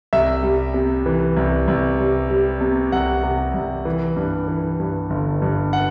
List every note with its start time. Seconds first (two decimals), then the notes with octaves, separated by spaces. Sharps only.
0.13 C2 E5
0.43 G3
0.74 C3
1.06 E3
1.37 C2
1.68 C2
1.99 G3
2.30 G3
2.61 C3
2.92 C2 F#5
3.23 C3
3.54 C2
3.85 E3
4.16 G2
4.48 E3
4.80 G2
5.10 G1
5.42 G2
5.73 F#5